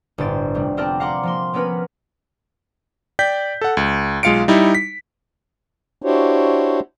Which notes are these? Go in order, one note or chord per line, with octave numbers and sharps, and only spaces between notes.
G1 A2 C5 A6 D7
F1 G3
B3 C4 G4 A#4 D5 A5
F5 F#5 A#5 C6 D6
F3 A#3 C6
A#3 B3 C#4 A#4 B4
D5 G5 G6 B6
A4 F#5
C#2
B1 G#3 F4 F5 C#7 D7
G3 D#4 E4
B6
D4 E4 F#4 G4 C5 C#5